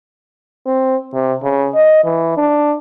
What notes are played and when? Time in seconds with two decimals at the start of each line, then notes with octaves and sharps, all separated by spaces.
0.66 C4
1.14 C3
1.43 C#3
1.75 D#5
2.04 E3
2.37 D4